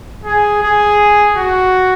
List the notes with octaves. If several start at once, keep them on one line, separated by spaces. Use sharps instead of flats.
G#4
G#4
F#4